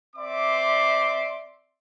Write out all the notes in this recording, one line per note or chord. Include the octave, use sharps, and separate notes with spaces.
C4 D5 E5 C6 D6